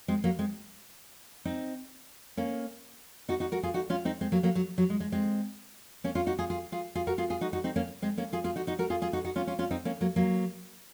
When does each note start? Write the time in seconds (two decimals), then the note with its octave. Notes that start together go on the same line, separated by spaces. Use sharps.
0.08 G#3 C4
0.24 F#3 A#3
0.39 G#3 C4
1.45 C4 D#4
2.37 A#3 C#4
3.29 D#4 F#4
3.40 D#4 F#4
3.52 F#4 A#4
3.63 F4 G#4
3.74 D#4 F#4
3.90 C#4 F4
4.05 C4 D#4
4.21 G#3 C4
4.32 F#3 A#3
4.43 F#3 A#3
4.55 F#3
4.78 F#3
4.90 G#3
5.00 G#3
5.12 G#3 C4
6.04 A#3 C#4
6.15 C#4 F4
6.27 D#4 F#4
6.39 F4 G#4
6.50 F4 G#4
6.72 F4 G#4
6.95 F4 G#4
7.07 F#4 A#4
7.18 F4 G#4
7.30 F4 G#4
7.41 D#4 F#4
7.53 D#4 F#4
7.64 C4 D#4
7.76 A#3 C#4
8.02 G#3 C4
8.18 A#3 C#4
8.33 F4 G#4
8.44 F4 G#4
8.56 D#4 F#4
8.67 D#4 F#4
8.79 F#4 A#4
8.90 F4 G#4
9.02 F4 G#4
9.13 D#4 F#4
9.24 D#4 F#4
9.36 C#4 F4
9.47 C#4 F4
9.59 C#4 F4
9.71 C4 D#4
9.85 A#3 C#4
10.01 F#3 A#3
10.16 F#3 A#3